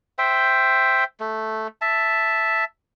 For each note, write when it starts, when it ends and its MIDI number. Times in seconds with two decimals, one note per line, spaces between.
0.18 1.04 72
0.18 1.04 76
0.18 1.04 79
1.20 1.67 57
1.81 2.64 76
1.81 2.64 81